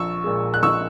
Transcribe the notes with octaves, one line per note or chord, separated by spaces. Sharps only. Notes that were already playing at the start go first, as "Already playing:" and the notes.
Already playing: A#1 C#6 E6
A#2 G#3
F#6
A#1 C#6 E6